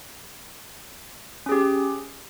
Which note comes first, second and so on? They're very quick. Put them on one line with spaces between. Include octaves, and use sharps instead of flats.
C#4 G#4 G4